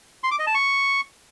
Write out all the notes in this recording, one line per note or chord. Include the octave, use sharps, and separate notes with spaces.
C6
D6
D#5
A5
C#6